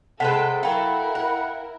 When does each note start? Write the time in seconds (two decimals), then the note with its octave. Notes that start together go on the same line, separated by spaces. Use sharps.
0.20 C3 G#3 A4 B4 F#5 G5 A5 B6
0.63 F#3 E4 A4 A#4 F5 G5 B5
1.15 F#5